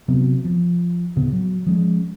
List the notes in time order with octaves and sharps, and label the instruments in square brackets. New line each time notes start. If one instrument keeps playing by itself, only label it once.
[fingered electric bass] C3 F#3 B3
F3
D2 A2 C#3 B3
F#3
F3 G#3 C#4